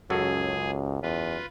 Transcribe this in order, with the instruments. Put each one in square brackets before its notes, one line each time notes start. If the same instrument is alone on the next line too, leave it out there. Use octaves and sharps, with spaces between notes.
[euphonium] C#2 [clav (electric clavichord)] F#2 F#3 A4 [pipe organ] G#4
[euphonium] E2 [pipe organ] F4 B4